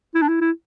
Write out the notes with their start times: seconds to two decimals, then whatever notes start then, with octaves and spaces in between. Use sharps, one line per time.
0.15 E4
0.22 D4
0.29 E4
0.41 E4